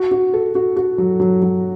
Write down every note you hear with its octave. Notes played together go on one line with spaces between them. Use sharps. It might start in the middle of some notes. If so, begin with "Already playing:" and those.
Already playing: F#4
F#4
A4
F#4
F#4
F#3
F#3
F#3